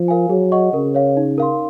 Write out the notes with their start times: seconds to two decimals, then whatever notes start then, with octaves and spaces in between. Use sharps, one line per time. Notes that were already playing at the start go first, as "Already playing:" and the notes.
Already playing: F3
0.08 A#4 F5 G#5
0.30 F#3 G#4
0.52 D#5 F#5 C#6
0.74 C#3 A#4
0.94 C#5 F5
1.17 D#4
1.38 A#4 F5 C6